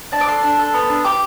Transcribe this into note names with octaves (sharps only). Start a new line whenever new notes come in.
D4 A5
D6
A4 C6
D4
A4
B3
D4
G4 D6